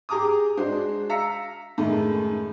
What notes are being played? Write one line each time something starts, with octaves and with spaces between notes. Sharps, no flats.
G4 G#4 A#5 D6 D#6
G#3 D4 F#4 G#4 C5
F5 A#5 E6 A#6 B6 C#7
F#2 A2 D#3 G#3 A3